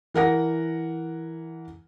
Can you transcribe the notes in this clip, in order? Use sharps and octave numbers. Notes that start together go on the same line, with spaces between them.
E3 A#4 F#5 A#6